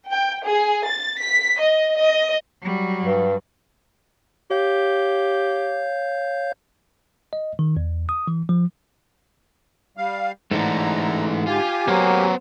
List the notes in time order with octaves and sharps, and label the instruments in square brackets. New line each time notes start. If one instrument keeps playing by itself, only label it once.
[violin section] G5
G#4
A6
B6
D#5
D#5
[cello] F#3 G3
[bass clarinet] G2
[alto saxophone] G4 [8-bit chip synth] C#5 F5 G6
[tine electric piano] D#5
D#3
E2
D#6
E3
F3
[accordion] G3 F5
[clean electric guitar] G#2 D3 [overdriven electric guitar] E3 A3 [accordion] A#5
[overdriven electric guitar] F4 [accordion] G4 G#5
[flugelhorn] F#3 [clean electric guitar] A#3 [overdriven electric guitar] B3 C5